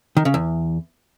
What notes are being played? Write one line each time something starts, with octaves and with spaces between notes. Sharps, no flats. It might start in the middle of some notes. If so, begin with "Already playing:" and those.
D#3
C#3
E2